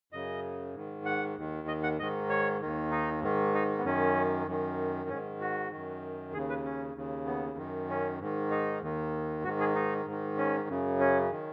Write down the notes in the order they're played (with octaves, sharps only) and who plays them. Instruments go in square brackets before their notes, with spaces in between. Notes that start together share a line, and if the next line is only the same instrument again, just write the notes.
[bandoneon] F#2 C#3 D#5
G#2 D#3
F#5
D#2 D#3
D#5
F#5
G#2 D#3 D#5
C#5
D#2 D#3
D#4
G#2 D#3
D#4
B3
F#2 D#3 C#4
F#2 D#3
G#2 D#3 C#4
F#4
F#2 D#3
D#2 C#3 G#4
B4
C#4
D#2 C#3
B3
F#2 D#3
C#4
G#2 D#3
D#4
D#2 D#3
G#2 F#4
D#3
G#4
D#4
G#2 D#3
C#4
F#2 C#3
C#4
D#3